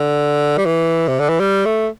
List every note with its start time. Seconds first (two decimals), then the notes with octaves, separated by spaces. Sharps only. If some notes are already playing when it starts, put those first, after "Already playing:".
Already playing: D3
0.57 G3
0.65 E3
1.08 C3
1.19 D3
1.29 E3
1.40 G3
1.66 A3